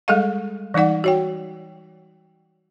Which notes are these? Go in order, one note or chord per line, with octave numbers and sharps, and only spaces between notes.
G3 G#3 G#4 A4 D#5 F5
E3 G3 D#4 D5 F#5
F#4 C#5 G5